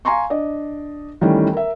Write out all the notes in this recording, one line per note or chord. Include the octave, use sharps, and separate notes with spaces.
F5 G#5 A#5 C6 C#6
D4 D5 D#5
D#3 E3 G3 A3 C#4
A#4 E5